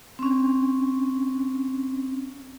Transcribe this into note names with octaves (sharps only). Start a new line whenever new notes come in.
C4 C#4